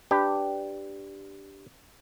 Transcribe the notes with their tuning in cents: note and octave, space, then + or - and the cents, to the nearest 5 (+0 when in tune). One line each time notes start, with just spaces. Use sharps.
D4 +0 G4 +0 B4 +20